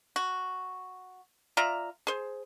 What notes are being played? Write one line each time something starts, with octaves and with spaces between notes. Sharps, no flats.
F#4
F4 D5 E5 A#5
G#4 C5